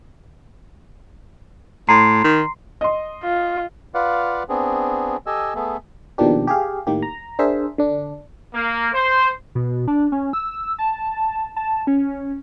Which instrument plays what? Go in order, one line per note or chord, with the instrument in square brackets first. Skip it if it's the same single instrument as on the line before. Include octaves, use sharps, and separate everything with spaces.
[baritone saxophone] A2 [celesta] A#5 C6 C7
[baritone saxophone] D#3
[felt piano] D#5 C6
[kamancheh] F4
[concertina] F4 B4 D5 F5 F#5
B3 C4 D4 G#4
G4 A4 D#5 G#5 E6
A3 B3 G#4 A4
[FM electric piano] B2 D#3 F3 A#3 D4 G4
G4 G#4 F5
A2 D#3 A#3 G4
A#5
D4 G#4 A#4 C5 E5
D3 D4
[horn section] A#3
C5
[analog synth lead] B2
D4
C#4
E6
A5
A5
C#4